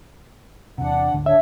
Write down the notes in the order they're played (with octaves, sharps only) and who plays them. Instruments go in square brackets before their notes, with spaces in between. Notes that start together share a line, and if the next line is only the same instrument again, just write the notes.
[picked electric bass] E2 C3 [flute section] D4 F#5
[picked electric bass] G#1 D2 D3
[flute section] D4 C#5 [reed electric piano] E5